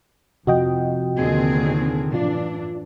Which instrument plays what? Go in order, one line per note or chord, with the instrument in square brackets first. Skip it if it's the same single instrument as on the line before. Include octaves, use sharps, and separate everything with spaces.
[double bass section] F2 [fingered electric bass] C3 F3 [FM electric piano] F#4 D#5 G5
[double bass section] D#2 D3 D#3 [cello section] A#2 C4 G#4
[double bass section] F#2 A2 E3 [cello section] D4 [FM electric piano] F4